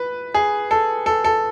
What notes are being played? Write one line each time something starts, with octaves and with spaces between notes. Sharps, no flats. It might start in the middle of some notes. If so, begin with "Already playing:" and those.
Already playing: B4
G#4
A4
A4
A4